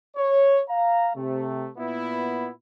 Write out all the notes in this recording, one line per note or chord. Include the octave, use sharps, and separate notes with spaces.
C#5
F5 A#5
C3 A3
A#2 B3 E4